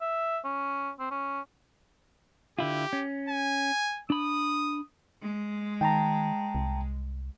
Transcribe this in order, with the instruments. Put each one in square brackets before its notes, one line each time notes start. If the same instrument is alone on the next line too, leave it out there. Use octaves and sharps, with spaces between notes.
[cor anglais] E5
C#4
C4
C#4
[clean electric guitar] D3 E4 F4 [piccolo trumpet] G4
[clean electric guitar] C#4
[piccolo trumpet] G#5
[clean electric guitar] D4 B5 [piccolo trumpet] D#6
[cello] G#3
[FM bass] D#3 [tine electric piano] G5 A5 A#5
[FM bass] C2